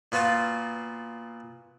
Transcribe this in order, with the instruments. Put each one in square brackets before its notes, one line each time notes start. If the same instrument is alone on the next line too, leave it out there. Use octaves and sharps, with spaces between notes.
[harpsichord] A#2 B3 F4 F#4 A5